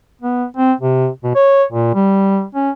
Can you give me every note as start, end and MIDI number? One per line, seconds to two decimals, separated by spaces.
0.22 0.45 59
0.57 0.73 60
0.80 1.08 48
1.24 1.32 47
1.36 1.64 73
1.72 1.91 46
1.95 2.44 55
2.55 2.71 61